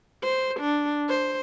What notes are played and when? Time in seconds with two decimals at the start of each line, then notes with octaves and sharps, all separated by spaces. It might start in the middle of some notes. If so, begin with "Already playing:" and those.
0.23 C5
0.60 D4
1.09 C5